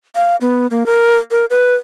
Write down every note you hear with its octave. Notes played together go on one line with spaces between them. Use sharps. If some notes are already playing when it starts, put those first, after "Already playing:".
F5
B3
A#3
A#4
A#4
B4